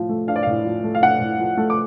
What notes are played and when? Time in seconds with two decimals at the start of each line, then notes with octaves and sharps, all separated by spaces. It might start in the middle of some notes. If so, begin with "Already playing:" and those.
Already playing: A2 F3
0.09 A3
0.28 D4 F5
0.36 D5
0.43 A2 F5
0.65 F3
0.84 A3
0.95 F5
1.02 D4 F#5
1.21 A2
1.39 F3
1.57 A3
1.70 D6